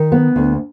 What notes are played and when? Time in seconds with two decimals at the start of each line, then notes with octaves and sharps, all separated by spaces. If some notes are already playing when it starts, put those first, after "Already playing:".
Already playing: D#3
0.12 B3
0.36 D2